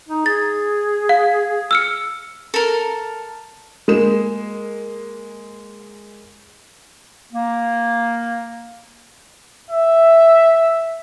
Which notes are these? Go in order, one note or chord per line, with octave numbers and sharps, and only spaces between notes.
D#4
G#4 A6
F5
E6 F6 C#7
A4 A#4
G#3 A#3 E7
A#3
E5